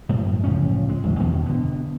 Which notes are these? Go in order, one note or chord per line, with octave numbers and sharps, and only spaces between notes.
F#2 A2
D1 C#2 F3 C#4
G#3
A1 E2
E2 G2 B2 D#3
D3 B3